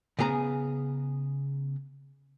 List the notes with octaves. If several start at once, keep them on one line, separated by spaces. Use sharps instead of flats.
C#3 B3 G#4 A#5